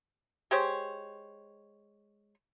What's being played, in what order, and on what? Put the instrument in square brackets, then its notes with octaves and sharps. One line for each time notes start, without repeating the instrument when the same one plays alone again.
[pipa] G#3 G4 C5 C#5